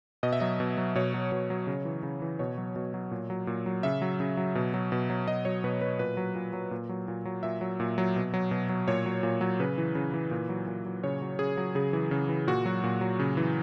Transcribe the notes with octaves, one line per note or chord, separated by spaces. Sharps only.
B2 D#5
E5
F#3 D#5
B2
F#3
B2 C#5
F#3
B2
F#3
C#3
E3
C#3
E3
B2 C#5
F#3
B2
F#3
A#2
F#3
A#2
F#3
C#3 E5
F#3
C#3
F#3
B2
F#3
B2
F#3
B2 D#5
F#3 C#5
B2 B4
F#3 B4
A#2 B4
F#3
A#2
F#3
A#2
F#3
A#2
F#3
A#2 E5
F#3
A#2
F#3
B2
F#3
B2
F#3
A#2 C#5
F#3
A#2
F#3
C#3 B4
E3
C#3
E3
A#2
F#3
A#2
F#3
C#3 C#5
F#3
C#3 G#4
F#3
C#3 G#4
E3
C#3
E3
A#2 F#4
F#3
A#2
F#3
C#3
E3